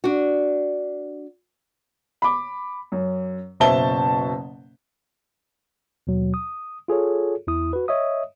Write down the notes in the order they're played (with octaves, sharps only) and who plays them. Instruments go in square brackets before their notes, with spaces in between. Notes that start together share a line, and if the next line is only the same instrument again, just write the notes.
[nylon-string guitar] D4 F#4
[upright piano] B5 D6
F#2
F#1 B2 C5 E5 A5 G7
[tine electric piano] D#2 B2 F#3
D#6
F4 G#4 A4 C#5
E2 E4 D#6
F#4 B4
C#5 D#5 E5 D#6